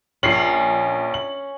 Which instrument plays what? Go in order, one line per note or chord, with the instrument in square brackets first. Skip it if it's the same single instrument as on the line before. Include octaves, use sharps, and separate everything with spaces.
[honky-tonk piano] A#1 C7 F#7 [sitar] C#4
[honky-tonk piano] F#7